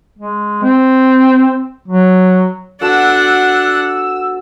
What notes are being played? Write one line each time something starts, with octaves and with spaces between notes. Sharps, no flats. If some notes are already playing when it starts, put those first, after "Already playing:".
G#3
C4
F#3
B3 D4 F#4 A4 F#5 E6